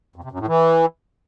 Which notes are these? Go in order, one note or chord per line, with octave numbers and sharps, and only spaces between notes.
F2
C3
F#2
A2
E3